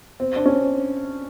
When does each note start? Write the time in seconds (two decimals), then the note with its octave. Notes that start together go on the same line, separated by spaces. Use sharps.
0.20 C4
0.36 D4
0.46 C#4